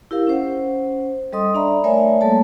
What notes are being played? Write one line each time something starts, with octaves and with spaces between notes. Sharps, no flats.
E4 G4 A#4 F5
C#4 C5 F#5
G3 A4 D#5 C6 D#6
D4 D5 E5 A#5 B5
A3 A#4 C#5 D5 E5 G#5
G3 A3 A#3 A4 C#5 A5